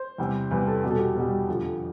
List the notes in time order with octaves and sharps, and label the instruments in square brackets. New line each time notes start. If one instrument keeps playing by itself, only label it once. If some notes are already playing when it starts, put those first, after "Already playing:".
Already playing: [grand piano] C5
E2 C3 G3
E2 C3 G3 B4
A4
E2 B2 G3 G4
A4
G4
E2 B2 G3
F2 D3 F3